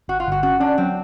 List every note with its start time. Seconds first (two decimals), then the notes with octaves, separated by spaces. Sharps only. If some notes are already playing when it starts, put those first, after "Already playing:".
0.08 G1 F#4
0.20 F4
0.26 G1
0.32 F#4
0.43 C#4 F#4
0.60 C#4 D4
0.78 F#3 C4